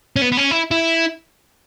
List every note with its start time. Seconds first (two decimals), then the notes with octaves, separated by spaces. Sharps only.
0.16 C#4
0.22 B3
0.32 B3
0.37 C#4
0.51 E4
0.71 E4